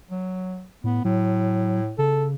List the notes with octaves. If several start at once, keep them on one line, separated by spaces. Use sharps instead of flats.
F#3
A2 B3
A2 F#3
C#3 A4